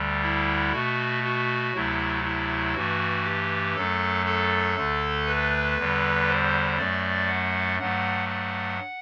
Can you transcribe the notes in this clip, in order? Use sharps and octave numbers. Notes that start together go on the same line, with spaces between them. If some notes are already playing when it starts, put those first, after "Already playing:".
Already playing: D2 D3 G3
E4
B2 A3 F#4
F#4
D2 C3 F#3 A3 E4
E4
G2 E3 A3 F#4
G4
F#2 F#3 A3 A4
A4
D2 D3 A3
B4
E2 D3 G3
C5
F#2 F#3 A3 D5
F#5
G2 F#3 A3 F#5
F#5